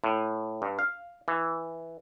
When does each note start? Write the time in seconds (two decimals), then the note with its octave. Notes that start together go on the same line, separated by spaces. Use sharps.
0.04 A2
0.62 G2
0.79 F5
1.28 E3